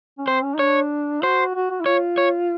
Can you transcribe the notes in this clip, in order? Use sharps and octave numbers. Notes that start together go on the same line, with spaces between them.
C#4
C4 C5
C#4
D#4
D4 C#5
F#4 C5
F#4
F#4
E4
F4 C#5
C#5